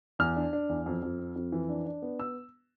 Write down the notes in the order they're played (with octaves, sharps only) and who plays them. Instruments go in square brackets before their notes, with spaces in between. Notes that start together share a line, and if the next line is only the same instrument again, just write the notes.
[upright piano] E2 F6
D4
D4
E2
F2
F2
C4
F2
E3
D4
D4
B3
E6